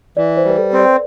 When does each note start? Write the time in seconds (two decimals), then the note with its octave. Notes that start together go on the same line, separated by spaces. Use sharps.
0.17 E3 D5
0.37 C5
0.45 G3 B4
0.58 A4
0.73 C4
0.79 D5